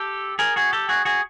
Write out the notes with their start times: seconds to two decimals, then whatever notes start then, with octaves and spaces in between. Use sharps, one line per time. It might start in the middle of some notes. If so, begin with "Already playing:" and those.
Already playing: G4 A4
0.39 G#4 A#4
0.56 F#4 G#4
0.73 G4 A4
0.89 F#4 G#4
1.05 F#4 G#4